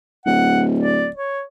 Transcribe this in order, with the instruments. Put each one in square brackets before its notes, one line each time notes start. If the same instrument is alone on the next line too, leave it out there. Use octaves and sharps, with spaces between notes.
[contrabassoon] D1 [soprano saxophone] F#5
[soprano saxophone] D5
C#5